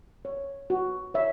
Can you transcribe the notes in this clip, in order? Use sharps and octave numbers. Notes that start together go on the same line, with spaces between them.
C#5
F#4
C#5 E5